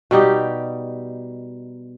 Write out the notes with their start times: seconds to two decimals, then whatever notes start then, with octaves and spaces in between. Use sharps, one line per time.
0.11 B2 G3 D#4 G4